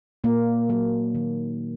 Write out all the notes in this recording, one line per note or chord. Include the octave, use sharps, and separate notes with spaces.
A#2 A#3
F#3 A#3
D#3